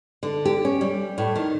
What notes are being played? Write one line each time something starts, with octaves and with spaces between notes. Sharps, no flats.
D3
G4
C#4
G3
A2
D#3